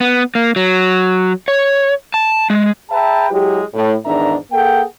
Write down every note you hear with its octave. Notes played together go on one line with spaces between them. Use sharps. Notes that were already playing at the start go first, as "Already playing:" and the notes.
B3
A#3
F#3
C#5
A5
G#3
G#4 B4 E5 G5 A5 A#5
F#3 G#3 E4 G4
A2
E2 G#2 D#3 D4 E5 A#5
A#3 G#4 A4 F#5 G5